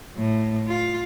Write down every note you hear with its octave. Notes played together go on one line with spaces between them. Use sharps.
A2
F4